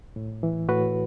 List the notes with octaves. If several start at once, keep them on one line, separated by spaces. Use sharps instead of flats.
A2
E3
A2 F#4 B4